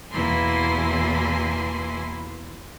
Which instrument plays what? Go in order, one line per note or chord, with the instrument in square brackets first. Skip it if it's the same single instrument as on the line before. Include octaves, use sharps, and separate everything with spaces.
[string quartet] E2 B2 A#3 E4 G#5 C6